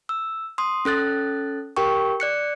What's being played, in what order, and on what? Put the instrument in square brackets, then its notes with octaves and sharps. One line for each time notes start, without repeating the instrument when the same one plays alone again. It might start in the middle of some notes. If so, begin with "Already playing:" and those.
[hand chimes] E6
C6 D#6
C#4 A4 F#6 A6
G4 A#4 G5 C#6
D5 F#6 C#7